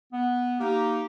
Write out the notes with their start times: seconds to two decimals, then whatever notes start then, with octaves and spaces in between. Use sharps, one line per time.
0.13 B3
0.60 A#3 D#4 G4